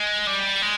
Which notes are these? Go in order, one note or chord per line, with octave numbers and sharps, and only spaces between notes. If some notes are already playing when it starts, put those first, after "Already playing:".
Already playing: G#3
G3
G#3